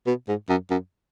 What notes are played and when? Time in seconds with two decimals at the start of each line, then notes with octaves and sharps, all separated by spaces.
0.07 B2
0.28 G#2
0.49 F#2
0.70 F#2